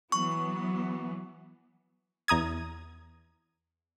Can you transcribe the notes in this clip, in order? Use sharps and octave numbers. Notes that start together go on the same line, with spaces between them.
E3 F#3 B3 C#6
E2 A#5 D#6 G#6